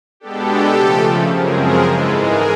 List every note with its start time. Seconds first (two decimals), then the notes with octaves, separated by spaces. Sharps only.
0.20 B2 G#3 B3 D4 G4 A4
0.77 C#3 F3 A3
1.34 F#2 C#3 F3 G#3 C4 G#4 A#4
1.62 G#4 A#4
1.90 G#2 E3 G#3 A4 B4
2.19 G#4 A#4